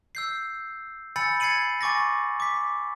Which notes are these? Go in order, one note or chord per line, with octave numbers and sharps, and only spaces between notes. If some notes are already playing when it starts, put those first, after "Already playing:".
E6 G6 C7
G#5 B5 E6 G6 A6 C#7
G#6 A6 C7 C#7 D#7 F#7
G#5 C#6 D6 A6 A#6
D6 B6